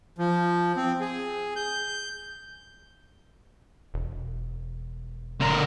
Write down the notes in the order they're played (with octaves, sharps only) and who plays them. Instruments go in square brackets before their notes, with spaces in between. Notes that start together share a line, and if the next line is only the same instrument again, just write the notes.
[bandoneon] F3
C4
G#4
G6
[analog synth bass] E1
[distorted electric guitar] D3 A#4